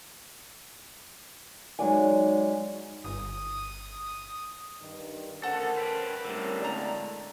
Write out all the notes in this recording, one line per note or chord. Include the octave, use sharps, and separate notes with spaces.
F#3 G#3 D#4 F#4 D5 G#5
G1 D#6
G2 D#3
D2 C#4 A4 A#4 C5 F#5 A5
B4 G5
A2 D3 G3 C#4 A#4
G#3 A3 D5 A#5